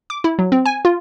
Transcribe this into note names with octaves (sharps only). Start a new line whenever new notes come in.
D6
E4
F#3
C4
G#5
F4